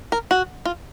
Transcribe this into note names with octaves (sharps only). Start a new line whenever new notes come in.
A#4
F#4
F4